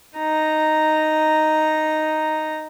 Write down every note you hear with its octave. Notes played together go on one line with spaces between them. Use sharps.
D#4 A#5